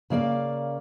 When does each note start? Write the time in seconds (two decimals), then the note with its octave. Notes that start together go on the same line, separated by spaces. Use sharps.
0.10 C#3 A#3 D5 F5